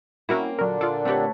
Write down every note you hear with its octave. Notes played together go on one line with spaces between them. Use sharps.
A#3 C4 C#4 E4 F#4 A#4
A#2 D3 F#3 D4 A#4
F4 A4 D5
A3 C4 G4 B4 C#5